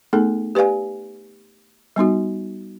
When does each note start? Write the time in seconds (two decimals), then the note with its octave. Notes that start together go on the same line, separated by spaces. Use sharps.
0.13 A3 B3 D#4 G#4 A4
0.55 G4 B4 D5 F5 G#5
1.96 G3 B3 D#4 F#4